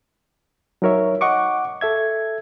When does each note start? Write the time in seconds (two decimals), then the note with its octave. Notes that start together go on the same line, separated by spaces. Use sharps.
0.82 F#3 D#4 A#4 C#5 E5
1.21 D#5 F#5 C#6 D6
1.81 A4 E5 G#6